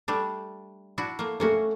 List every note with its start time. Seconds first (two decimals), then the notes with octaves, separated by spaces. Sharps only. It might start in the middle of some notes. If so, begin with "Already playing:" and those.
0.08 G3 A3 D4
0.98 D4 E4 F#4
1.19 A3 A#3
1.40 A3 A#3 C#4 F#4 A4